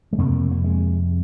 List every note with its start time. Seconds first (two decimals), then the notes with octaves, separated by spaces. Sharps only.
0.13 G#3
0.18 F2 C3 A#3
0.51 A#3
0.64 G#3